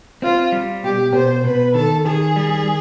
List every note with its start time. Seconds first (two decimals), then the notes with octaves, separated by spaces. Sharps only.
0.22 C4 F4
0.52 G3
0.83 B2 G4
1.13 B2 C5
1.44 B2 B4
1.74 D#3 A4
2.05 D#3 G#4
2.36 G3